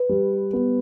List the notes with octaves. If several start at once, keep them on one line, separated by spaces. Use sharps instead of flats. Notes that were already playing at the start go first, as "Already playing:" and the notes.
Already playing: B4
G3
B3